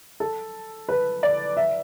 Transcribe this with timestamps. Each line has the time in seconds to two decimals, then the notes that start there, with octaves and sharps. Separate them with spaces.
0.20 A4
0.89 B4
1.23 D5
1.57 E5